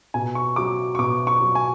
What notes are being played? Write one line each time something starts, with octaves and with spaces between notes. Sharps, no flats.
B2 G#5
C#6
F#3 D6
C#6
B2 D6
C#6
F#3
G#5